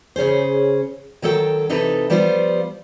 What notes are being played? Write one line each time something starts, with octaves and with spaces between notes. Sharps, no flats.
C#3 C#4 G#4 C5
D#3 F#3 A4 D5 G5
C3 E3 D#4 A4 B4
F3 G3 B3 F4 B4 C5